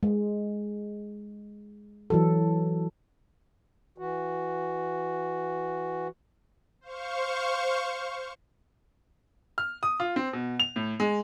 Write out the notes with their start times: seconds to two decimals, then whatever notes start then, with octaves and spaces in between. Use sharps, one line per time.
0.03 G#3
2.10 E3 F#3 A4
3.98 E3 F#4
6.81 C5 F5 C#6
9.58 F6
9.83 D#6
10.00 F4
10.16 C4
10.33 B2
10.60 F7
10.76 A2
11.00 G#3